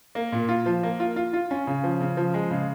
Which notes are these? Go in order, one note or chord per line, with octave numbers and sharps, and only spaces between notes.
A#3
A#2
F4
F3
A#3
F4
F4
F4
C#4
C#3
F3
C#3
F3
G#3
C#3